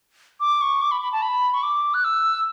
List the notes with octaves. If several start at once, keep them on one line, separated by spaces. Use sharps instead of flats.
D6
C#6
D6
B5
B5
A5
B5
C#6
D6
F#6
E6